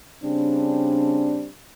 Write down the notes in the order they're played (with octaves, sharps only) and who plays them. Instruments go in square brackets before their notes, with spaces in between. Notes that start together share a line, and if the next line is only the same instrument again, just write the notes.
[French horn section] C#3 G3 C4 D4